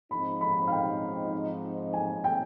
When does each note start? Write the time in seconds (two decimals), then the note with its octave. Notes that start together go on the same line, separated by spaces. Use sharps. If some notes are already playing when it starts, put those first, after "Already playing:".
0.11 G#2 F3 C4 D#4 B5
0.41 B5
0.68 F5
0.72 G5
1.93 G#5
2.24 G5